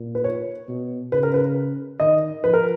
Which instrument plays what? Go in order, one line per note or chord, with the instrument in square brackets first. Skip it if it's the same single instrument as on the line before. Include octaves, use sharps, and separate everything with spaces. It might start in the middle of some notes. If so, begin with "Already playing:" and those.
Already playing: [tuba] A#2
[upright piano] B4
C#5
[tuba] B2
[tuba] C#3 [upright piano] B4
[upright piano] A#4
B4
[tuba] D#3 [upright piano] D#5
[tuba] F3 [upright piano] B4
[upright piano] A#4